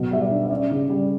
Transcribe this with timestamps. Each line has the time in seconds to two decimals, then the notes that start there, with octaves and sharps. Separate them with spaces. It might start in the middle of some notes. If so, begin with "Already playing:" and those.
Already playing: B2 F#3
0.11 G3 E5
0.21 D5
0.31 D4
0.45 E5
0.50 C#4 D5
0.70 C#3
0.90 G3